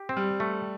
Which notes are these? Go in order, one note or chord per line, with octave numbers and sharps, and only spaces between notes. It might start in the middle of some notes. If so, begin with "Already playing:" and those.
Already playing: G4
C4
G3
A3